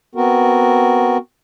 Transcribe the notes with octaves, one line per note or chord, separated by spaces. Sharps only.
B3 C4 F#4 A#4